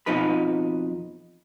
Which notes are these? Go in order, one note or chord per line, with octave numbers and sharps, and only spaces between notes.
F2 B2 F3 D#4 B4 B5